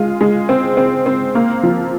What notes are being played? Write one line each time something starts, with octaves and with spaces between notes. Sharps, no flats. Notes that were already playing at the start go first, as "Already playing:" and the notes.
Already playing: G#3 F4
G#3
C4
C4
C4
A#3
F3